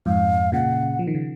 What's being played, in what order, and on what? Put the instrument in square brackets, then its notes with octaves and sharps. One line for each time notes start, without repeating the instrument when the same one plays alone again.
[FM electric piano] F2 G#2 [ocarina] F5
[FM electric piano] A#2 C#3 [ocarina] F#5
[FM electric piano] F3
D#3
C#3